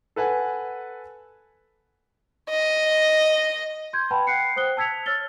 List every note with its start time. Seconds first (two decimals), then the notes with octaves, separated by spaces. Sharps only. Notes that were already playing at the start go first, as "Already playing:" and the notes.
0.16 A4 B4 F#5 G#5
2.49 D#5
3.93 C6 G6 G#6
4.11 B4 F#5 G5 A5 B5
4.27 F#5 G5 F#6 C7 C#7
4.56 C5 D#6 F#6 G7
4.77 A5 E6 G#6 B6 C#7 F7
5.06 C#5 E6 F6 A6 G7